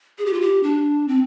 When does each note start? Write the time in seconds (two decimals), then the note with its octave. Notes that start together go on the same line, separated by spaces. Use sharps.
0.18 G#4
0.26 G4
0.33 F4
0.41 G4
0.63 D4
1.08 C4